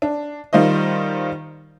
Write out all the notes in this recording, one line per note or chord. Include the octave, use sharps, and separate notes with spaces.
D4
D#3 G3 F4 C5 D#5